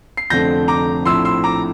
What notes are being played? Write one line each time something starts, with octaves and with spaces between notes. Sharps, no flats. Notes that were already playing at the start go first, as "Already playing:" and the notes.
C7
F1 F2 D3 A3 C4 G6 A#6
A#5 D6
A#1 A2 F3 C4 E4 C6 E6
C6 E6
A#5 D6